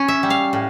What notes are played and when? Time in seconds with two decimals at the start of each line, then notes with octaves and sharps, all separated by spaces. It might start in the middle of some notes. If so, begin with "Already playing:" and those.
Already playing: C#4
0.08 E5
0.23 G3
0.30 F5
0.53 A2